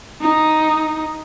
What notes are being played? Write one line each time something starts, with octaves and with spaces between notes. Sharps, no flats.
D#4